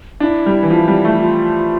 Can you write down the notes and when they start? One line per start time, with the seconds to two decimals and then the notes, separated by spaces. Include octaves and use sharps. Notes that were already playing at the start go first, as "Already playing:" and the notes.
0.20 D4 E4
0.46 G3
0.63 E3
0.70 F3
0.88 G3
1.05 A3
1.21 F4